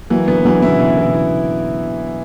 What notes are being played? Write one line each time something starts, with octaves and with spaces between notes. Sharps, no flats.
E3 F#3 A#3
D3 F#3 B3
D3 E3 F#3
C#3 E4
B2 E3
B2 E3
E4